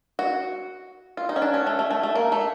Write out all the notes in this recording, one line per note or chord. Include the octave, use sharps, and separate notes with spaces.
F#4
F4
D#4
C#4
D4
C#4
A3
A3
A3
A3
A#3
A3